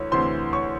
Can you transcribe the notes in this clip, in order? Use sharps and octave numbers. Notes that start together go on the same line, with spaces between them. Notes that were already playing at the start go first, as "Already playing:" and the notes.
Already playing: D2 E3 C#5
D2 C3 E3 C5 C6
C#5 C#6